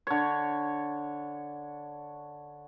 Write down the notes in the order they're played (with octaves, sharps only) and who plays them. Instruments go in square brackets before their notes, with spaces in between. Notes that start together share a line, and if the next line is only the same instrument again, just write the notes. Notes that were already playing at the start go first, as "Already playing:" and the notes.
[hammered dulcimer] D3 C#5